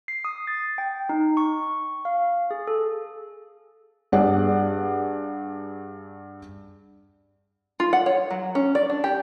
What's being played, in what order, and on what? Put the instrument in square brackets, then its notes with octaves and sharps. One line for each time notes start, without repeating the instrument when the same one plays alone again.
[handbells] C7
D#6
A6
G5
D#4
C#6
F5
G#4
A4
[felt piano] G2 G#4 D5 F#5
[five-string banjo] F4
F#5
C#5
F#3
C#4
D5
D4
G4